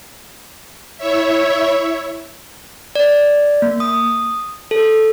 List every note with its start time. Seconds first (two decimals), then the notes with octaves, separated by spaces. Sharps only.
0.97 E4 C#5 E5
2.95 D5
3.62 A#3
3.80 D#6
4.71 A4